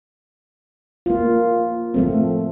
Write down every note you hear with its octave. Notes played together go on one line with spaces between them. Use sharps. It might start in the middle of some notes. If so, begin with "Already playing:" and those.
A#3 F4
F3 A3 C4